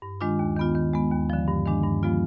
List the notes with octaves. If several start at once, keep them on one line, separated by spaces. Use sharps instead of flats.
G2
D#3 G#3 D4 F4
D#2
D#3 B3 F4
D#3
G#3 B3
D#2
D3 F3
G2
D#3 G#3 D4
G2
F3 G#3 B3 F4